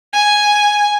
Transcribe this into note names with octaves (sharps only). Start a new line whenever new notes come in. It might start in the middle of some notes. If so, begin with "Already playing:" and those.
G#5